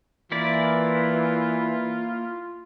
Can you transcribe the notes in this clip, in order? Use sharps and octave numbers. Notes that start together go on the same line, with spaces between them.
E3 A#3 E4 F4 D5